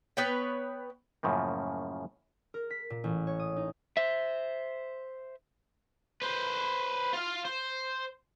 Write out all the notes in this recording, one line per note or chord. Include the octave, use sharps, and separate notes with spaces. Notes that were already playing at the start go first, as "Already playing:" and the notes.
B3 B4 C#5 G5
F#2 A2 C#3 F3 A#3
A#4
B6
A#2
A1
C#5
D#6
D#4
C5 E5
B4 C5
F4 F5
C5